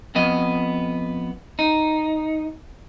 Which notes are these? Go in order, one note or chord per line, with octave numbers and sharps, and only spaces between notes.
F2 B3 D#5
D#4